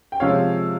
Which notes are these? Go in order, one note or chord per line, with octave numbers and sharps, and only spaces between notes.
G5
C3 F3 G#3 C#5 F5